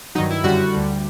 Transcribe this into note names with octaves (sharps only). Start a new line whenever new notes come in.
G2 D#3 F#3 D#4
E4
F#2 D3 G3 F#4
D2 D3 G3